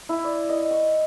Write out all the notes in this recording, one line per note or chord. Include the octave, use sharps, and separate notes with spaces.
E4
D5
D#5
C#6